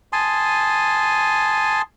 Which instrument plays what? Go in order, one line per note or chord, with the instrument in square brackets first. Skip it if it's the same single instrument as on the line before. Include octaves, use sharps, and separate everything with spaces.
[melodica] G#5 A5 C6 D#6